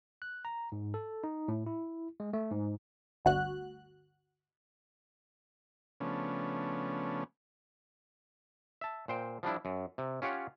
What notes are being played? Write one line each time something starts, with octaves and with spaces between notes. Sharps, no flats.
F#6
A#5
G#2
A4
D#4
A2
E4
G#3
A3
G#2
G1 D2 F#4 F#6
C#3 F3 A3 B3 C#4 D4
E5 A5
A#2 C5 G5
F3 G3 D4 E4
F#2
C3
C#4 F4 G4 C#5 F#5